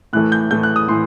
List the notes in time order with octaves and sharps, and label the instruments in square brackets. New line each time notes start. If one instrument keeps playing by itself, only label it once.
[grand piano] A2 E3 A3 F#6
G6
A2 E3 A3 G6
F#6
D#6
A2 E3 C6